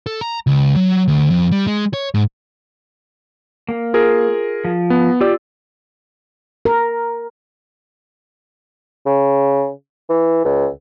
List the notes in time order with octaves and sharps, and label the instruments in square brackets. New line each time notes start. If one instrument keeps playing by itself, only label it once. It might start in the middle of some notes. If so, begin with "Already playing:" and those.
[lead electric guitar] A4
A#5
C#2
F#3
D2
F2
G3
G#3
C#5
G#2
[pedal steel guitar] A#3
[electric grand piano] F4 G#4 A#4
[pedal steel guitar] F3
[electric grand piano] B3
[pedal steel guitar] F4 E6 [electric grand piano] G4 D5
[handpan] A#4
[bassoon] C#3
E3
C#2